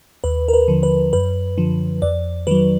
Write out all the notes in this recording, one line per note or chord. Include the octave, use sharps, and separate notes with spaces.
D#2 B4
A#4
B4
D3 F3
B4
F#2 B4
D3 F3
F2 D5
D#3 F#3 B4